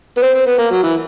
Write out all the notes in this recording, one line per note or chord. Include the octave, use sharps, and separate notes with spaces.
B3
C4
C4
B3
A#3
F#3
E3